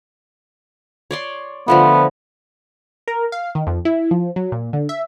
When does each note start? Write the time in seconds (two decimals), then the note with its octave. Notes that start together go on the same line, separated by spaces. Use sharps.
1.11 C#5 D5 C6
1.68 D3 F3 A3 B3
3.08 A#4
3.32 F5
3.55 D#3
3.67 F2
3.85 E4
4.11 F3
4.36 F#3
4.52 A#2
4.73 D3
4.89 E5